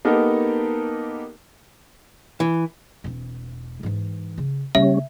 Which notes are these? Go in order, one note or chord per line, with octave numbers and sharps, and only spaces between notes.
A#3 B3 D#4 G4 A4 A#4
E3
E1 C4
G#2 E3
C#3
C#3 G3 A#3 C#4 E5